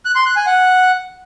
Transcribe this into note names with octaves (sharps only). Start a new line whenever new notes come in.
F#6
C6
F#6
G#5
F#5